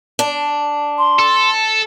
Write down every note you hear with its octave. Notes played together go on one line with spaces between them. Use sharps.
D4
C6
A4